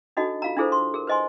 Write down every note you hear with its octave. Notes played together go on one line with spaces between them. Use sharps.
D4 D#4 F#4 A4 D#5
F4 F5 A#5
D4 E4 F4 G#4 A4 C5
C6
G#4 A#4
B4 C5 D#5 G#5 C6